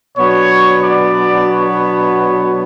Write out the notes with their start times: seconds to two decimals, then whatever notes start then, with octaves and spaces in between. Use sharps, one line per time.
0.16 B2 F#3 B3 D4 C#5
0.84 D5
1.51 C#5